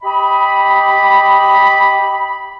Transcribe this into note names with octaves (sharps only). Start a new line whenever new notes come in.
G4 D#5 B5